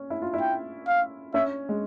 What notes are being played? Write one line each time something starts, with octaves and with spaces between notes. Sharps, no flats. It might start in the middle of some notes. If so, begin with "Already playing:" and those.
Already playing: C#4
E4
F4
E4
G5
F5
C#4 E5
G#3